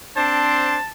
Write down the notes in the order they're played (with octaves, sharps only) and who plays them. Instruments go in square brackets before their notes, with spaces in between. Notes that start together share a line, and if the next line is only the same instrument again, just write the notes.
[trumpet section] C4 D4 C5 [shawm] A5